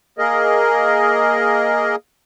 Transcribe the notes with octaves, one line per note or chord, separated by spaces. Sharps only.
A#3 G#4 A#4 D#5